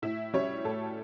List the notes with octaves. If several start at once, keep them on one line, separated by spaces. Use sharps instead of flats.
A2 E4 E5
G3 C#4 C#5
A2 A4